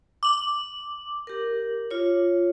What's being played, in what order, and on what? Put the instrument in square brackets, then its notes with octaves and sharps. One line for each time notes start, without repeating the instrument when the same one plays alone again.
[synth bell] D6 F#7
[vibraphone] G4 A#4
F4 C#5